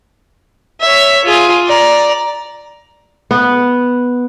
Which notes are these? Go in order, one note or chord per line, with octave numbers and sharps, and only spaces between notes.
C#5 E5
F4 G#4
D5 A#5
B3